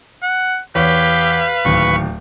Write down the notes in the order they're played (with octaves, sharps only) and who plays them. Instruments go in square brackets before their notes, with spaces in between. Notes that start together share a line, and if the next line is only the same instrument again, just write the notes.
[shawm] F#5
[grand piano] E2 C#5 [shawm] G4 [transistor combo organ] B4 [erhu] F5
[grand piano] D1 D#2 [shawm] C#6